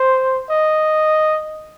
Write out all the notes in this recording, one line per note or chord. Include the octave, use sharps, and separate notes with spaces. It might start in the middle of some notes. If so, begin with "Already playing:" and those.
Already playing: C5
D#5